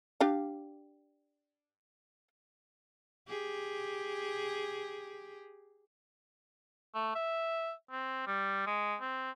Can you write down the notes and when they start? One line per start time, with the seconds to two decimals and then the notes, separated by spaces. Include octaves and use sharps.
0.20 D4 G4 F5
3.29 G4 G#4
6.95 A3
7.15 E5
7.91 C4
8.27 G3
8.67 G#3
9.01 C4